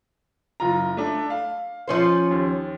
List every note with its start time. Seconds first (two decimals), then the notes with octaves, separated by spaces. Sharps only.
0.60 F#1 F4 A#5
0.97 A3 D4
1.30 F5
1.88 F3 C#4 C5
2.31 D#2